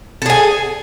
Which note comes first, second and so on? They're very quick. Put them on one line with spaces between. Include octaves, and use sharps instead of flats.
A4 G#4 G#5